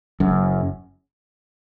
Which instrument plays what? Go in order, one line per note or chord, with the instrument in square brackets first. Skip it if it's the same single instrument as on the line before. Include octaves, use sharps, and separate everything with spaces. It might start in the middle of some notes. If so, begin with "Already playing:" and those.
[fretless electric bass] F#1 F#2